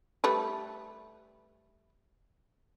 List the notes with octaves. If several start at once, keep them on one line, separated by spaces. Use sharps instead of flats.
G3 A3 B4